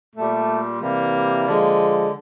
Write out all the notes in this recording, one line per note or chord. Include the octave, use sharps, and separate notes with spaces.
A#2 G3 A3
C3 E3 G3 A#3
D3 F3 G#3